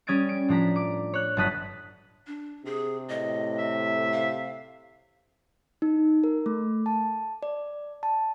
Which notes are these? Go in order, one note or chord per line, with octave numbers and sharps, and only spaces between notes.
G3 C#4 D#6 G#6 A6 D7
D7
A2 F3 D4 A#5 B6
D6
C#5 F#6
G1 F#3 A5 D#6 F#6 B6
D4
C3 G#4
A2 D#5
E5
F5
D#4
A#4
A3
A5
D5
A5